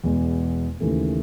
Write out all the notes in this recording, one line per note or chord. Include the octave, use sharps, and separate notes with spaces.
E2 B2 G#3 B3
D#2 C#3 E3 A3